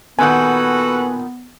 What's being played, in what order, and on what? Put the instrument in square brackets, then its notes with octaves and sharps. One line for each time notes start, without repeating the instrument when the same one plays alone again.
[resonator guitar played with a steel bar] A#2 D#3 F#5 [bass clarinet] B3 [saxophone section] F#4 A4 B4 [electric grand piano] G#5